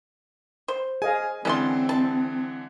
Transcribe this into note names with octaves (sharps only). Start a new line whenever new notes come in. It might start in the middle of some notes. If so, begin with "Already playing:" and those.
C5
G#4 D#5 F5 G#5
D3 E3 G#3 C4 C#4 A5 C6
A5